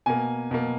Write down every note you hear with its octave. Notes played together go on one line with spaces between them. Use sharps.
B2 A#3 G#5
B2 A#3